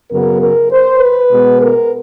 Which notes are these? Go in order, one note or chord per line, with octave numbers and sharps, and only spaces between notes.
F#2 C#3 F#3 B3 A#4
A#4
C5
B4
B2 G#3 B3
A#4